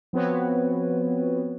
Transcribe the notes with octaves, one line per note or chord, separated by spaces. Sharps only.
F3 B3 C4 F#4 B4 C#5